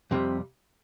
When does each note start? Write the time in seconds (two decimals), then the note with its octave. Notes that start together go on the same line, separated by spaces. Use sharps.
0.11 F2 C3 G3